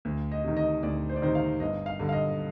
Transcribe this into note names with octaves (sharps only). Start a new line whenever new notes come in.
D2
D#5
C3 D#3
D#5
D2 D5
C5
D5
C3 D#3 C5
F5
G1 D#5
F5
G2 D3
F5
D#5